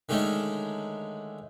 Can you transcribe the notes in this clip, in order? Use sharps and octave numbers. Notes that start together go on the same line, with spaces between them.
D3 D#3 G#3 A3 C#4 D#4